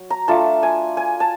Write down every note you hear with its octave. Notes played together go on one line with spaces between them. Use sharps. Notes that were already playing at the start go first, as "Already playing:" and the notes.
Already playing: F#3
A#5
A3 D4 F4 A5
G#5
G#5
A5